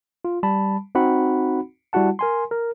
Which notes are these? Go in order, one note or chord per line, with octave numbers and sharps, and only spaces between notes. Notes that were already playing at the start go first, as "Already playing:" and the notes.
F4
G3 A5 B5
C4 D#4 F#4 F#5 B5
G3 E4 F#4 F#5 A5
A#4 G#5 C6
A#4